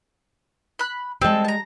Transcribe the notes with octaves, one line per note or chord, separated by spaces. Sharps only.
B5 F#6
G3 G#3 C4 A4
A5 A#5